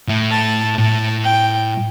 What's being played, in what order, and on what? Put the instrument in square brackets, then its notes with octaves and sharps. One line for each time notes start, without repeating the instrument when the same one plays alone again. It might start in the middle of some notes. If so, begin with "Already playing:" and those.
[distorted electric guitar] A2
[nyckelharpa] A5
[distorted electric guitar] A2 [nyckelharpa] A5
[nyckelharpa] G5